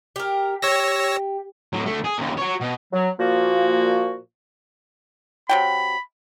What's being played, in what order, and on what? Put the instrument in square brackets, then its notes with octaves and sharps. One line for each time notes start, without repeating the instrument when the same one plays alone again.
[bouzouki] G4 A#4
[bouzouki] G4 [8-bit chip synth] C#5 E6 A#6
[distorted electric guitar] A2 F#3
D3 A3
G#4
D#2 C#3
F#4 C#5
B2
[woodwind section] F#3
A#2 F3 A#3 F#4
[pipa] C3 F#3 G5 [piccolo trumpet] B5